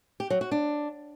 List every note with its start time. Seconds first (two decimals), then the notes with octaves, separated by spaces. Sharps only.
0.20 G4
0.30 F#3
0.41 F#4
0.51 D4